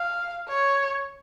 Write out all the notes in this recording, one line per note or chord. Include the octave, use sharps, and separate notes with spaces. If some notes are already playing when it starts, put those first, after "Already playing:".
Already playing: F5
C#5